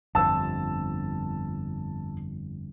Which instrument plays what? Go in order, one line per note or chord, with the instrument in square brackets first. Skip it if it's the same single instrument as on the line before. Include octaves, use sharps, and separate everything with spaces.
[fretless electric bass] G1 F2 [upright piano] A5 E6